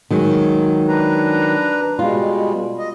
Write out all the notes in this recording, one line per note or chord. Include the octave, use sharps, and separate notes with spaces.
D#3 F#3 G#3
D4 B4 A#5
B2 G3 G#3 F4
D#5